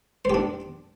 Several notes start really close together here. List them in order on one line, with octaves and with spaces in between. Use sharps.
C5 G4 D4